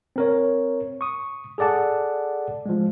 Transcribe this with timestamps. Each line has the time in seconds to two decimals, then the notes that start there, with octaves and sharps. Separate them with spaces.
0.16 C4 A#4 C#5
1.01 C#6 D#6
1.58 G#4 A4 D5 F#5 A5
2.66 F3 G#3